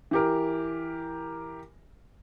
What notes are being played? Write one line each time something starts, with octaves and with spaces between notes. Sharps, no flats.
E3 G4 A#4